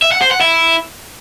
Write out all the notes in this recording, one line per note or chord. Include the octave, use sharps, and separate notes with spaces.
E5
F#5
C5
F#5
E4